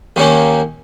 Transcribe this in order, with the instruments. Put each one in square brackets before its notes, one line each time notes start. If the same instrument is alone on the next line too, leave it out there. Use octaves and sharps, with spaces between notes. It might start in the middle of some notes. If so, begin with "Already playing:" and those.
[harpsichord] D#2 D#3 A#3 C#4